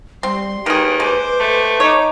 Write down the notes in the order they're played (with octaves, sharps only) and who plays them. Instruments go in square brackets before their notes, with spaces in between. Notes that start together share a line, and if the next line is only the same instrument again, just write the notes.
[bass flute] G3 [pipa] C4 [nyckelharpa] C6
[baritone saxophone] D#2 [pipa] D#3 G#4 [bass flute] B4
[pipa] G#3 [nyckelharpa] C5 D6
[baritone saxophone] A3
[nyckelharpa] D#4 D6 [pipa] C#5